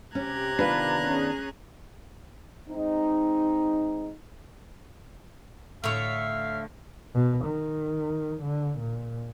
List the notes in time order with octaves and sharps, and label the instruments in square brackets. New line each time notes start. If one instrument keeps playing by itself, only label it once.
[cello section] C3 G4 [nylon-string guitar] C#4 [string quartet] A#5 F#6 G#6
[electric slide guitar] D#3 B3 D4 [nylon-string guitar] F4 B4
[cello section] C#4 G#4
[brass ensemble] G#3 C4 D#4
[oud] A2 D3 [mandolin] C#5 E5 [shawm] F5
[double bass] B2
D#3
D3
A#2